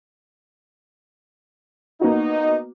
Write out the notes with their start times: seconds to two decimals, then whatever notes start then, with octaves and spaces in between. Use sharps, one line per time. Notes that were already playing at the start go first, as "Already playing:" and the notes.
2.01 A#3 B3 D#4 F#4